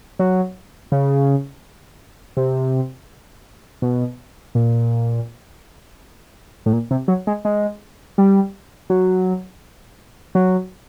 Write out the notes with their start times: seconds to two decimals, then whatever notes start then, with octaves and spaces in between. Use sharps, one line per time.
0.19 F#3
0.92 C#3
2.37 C3
3.82 B2
4.55 A#2
6.66 A2
6.73 A#2
6.91 C3
7.08 F#3
7.27 G#3
7.45 G#3
8.18 G3
8.90 F#3
10.35 F#3